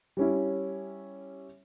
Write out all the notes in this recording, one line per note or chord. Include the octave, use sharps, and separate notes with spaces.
G3 C#4 E4